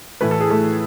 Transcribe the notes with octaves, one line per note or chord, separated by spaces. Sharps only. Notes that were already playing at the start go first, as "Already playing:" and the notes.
A2 E3 A3 B4
A4
G#4
A3 A4